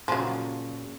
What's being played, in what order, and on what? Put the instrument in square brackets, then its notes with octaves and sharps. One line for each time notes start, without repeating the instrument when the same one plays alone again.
[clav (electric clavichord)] A#2 C#3 [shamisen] F3 F#3